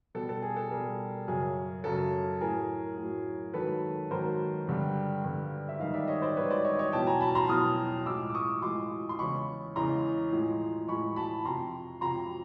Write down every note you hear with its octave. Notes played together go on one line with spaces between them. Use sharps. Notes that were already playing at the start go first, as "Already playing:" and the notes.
B2 G3 A4
A4
G#4
A4
B2 G3 G#4 A#4
F#2 C#3 F#3 G#4
F#2 C#3 F#3 A4
A2 F#3 G#4 A#4
A2 F#3
G#2 D#3 F#3 A4 B4
G#2 D#3 F#3 A#4 C5
G2 D3 G3
G2 D3 G3
E5
G#2 D#3 G3 D#5 F5
D5 E5
C#5 D#5
C5 D5
G#2 D#3 G3 B4 C#5
C5 D5
C#5 D#5
D5
C#5 D#5
E2 B2 F#3 G5 A5
G#5 A#5
A5 B5
A#5 C6
E2 B2 F#3 D#6 F6
A2 F3 G#3 D6 E6
D6
C#6 D#6
A2 F3 G#3 C6 D6
C6
E2 C#3 E3 G#3 B5 C#6
E2 C#3 E3 G#3 A#5 C6
A2 F3 G#3
A2 F3 G#3 B5 C#6
A5 B5
F2 C3 F3 A#5 C6
F2 C3 F3 A#5 C6